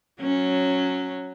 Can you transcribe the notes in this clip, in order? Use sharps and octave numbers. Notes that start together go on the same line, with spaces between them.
F#3 C#4